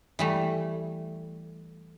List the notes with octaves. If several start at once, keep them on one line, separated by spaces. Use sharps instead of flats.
E3 G3 A3